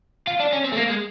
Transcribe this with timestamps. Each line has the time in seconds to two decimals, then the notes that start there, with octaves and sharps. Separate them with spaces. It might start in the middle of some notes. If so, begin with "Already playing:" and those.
0.27 F4
0.40 D4
0.52 C#4
0.64 C4
0.72 A3
0.77 A#3
0.89 G#3